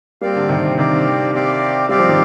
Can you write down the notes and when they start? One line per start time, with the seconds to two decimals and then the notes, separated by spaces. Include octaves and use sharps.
0.21 G3 A#3 C4 G4 D5 F5
0.36 D3
0.49 C3 D#3
0.78 C3 D#3 C4 G4 D5 F5
1.34 C4 G4 D5 F5
1.89 G3 C4 G4 D5 F5
1.99 F3
2.09 D#3 G3